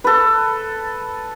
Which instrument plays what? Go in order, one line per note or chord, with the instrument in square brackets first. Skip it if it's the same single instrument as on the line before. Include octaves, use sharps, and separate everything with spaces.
[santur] A4 B4